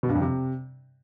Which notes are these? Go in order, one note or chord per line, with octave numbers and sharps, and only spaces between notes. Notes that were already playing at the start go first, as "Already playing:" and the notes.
B2
G2
F2
C3